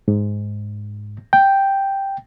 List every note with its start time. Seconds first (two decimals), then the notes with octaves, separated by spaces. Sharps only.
0.08 G#2
1.33 G5